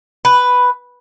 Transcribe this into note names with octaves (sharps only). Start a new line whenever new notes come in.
B4